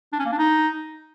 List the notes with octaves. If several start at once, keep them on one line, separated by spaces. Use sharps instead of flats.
D4
C#4
A#3
D4
D#4